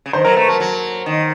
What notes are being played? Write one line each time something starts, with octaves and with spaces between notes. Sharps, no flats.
C#3
D#3 C5
F#3 A#4
A3 A#4
F#3 A#4
F#3
D#3